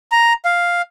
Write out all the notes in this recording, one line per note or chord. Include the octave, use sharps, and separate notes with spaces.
A#5
F5